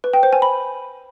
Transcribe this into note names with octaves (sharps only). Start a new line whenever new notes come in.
B4
G5
C5
G#5
B5